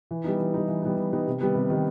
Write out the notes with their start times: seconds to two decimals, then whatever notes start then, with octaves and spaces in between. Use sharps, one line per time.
0.11 E3
0.24 G3 B3 D#4
0.40 E3
0.54 G3 B3 D#4
0.68 E3
0.82 G3 B3 D#4
0.98 E3
1.13 G3 B3 D#4
1.27 C3
1.41 D#3 G3 B3
1.55 C3
1.70 D#3 G3 B3